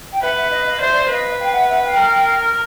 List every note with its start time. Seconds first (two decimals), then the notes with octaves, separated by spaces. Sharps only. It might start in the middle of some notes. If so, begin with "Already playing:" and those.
0.12 G5
0.21 B4 E5 F#5
0.36 E5 F#5
0.51 D#5 F5
0.65 D#5 F5
0.80 C5 D5 E5
1.09 B4 D#5 F5
1.39 F5 G5
1.53 E5 F#5
1.68 E5 F#5
1.83 F5 G5
1.97 A#4